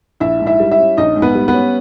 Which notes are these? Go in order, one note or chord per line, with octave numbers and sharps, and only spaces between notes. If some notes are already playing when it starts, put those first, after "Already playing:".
A#1 E4 E5
G#2
E4 E5
G3
E4 E5
C#4
A#1 D#4 D#5
G#2
B3 B4
G3
B3 B4
C#4